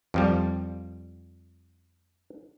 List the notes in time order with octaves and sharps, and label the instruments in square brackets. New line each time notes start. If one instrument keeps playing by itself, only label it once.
[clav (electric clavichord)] F2 F3 G3